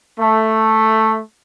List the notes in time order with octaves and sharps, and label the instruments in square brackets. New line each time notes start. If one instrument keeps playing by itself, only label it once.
[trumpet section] A3